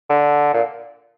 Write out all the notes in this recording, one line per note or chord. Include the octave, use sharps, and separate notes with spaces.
D3
A#2